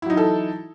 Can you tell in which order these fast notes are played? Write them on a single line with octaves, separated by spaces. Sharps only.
E4 F#3 D#4 E3 A4